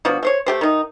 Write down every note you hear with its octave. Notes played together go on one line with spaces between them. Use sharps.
B2 F3 D4 F#4
A3 C5 C#5
A3 G4 C5
D#3 D#4